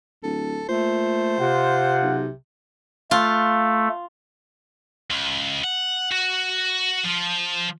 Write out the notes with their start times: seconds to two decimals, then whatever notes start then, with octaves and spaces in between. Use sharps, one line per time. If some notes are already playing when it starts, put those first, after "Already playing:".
0.23 D1 A4
0.68 A#2 A3 C5
1.40 C3 F4 F#5
2.02 B1
3.11 A3 F4
5.11 C#2
5.64 F#5
6.12 F#4
7.04 F3